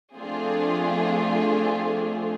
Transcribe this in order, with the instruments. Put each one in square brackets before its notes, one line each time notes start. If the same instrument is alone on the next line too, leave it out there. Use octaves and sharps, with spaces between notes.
[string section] F3 A3 C4 D4 F4 G#4